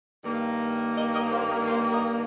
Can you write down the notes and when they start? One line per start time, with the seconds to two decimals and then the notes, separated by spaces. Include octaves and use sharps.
0.24 G2 D#3 A#3
0.96 A#4 D#5
1.14 A#4 D#5
1.31 C5 F5
1.49 A#4 D#5
1.68 C5 F5
1.91 A#4 D#5